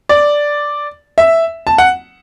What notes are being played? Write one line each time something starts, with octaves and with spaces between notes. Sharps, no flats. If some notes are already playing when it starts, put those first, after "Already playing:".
D5
E5
A5
F#5